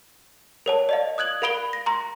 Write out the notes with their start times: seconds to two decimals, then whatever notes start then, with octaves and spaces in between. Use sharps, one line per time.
0.66 A#4 C#5 A5
0.89 D5 D#5 F5
1.18 D#6 F#6 G#6 F#7
1.42 A#4 F5 B5 D7 G7
1.73 A#6
1.86 A#5 C6